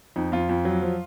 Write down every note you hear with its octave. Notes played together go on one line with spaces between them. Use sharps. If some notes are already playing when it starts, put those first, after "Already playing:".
F2 D#4
F2 F4
F2
F#3
F3